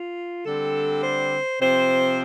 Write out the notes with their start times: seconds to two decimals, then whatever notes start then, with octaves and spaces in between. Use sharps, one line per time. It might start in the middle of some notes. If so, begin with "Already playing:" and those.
Already playing: F4
0.45 D3 G3 C4 A4
1.02 C5
1.60 C3 F3 C4 C5